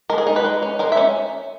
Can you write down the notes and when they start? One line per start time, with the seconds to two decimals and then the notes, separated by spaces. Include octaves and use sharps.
0.10 G#3 A#4
0.18 G#4
0.27 D#4 A#4
0.36 B4
0.45 G#3
0.62 C#4
0.79 G#3 A#4
0.92 E5
0.97 C#4